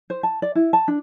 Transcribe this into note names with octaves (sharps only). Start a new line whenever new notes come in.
C5
A5
D5
E4
A5
D4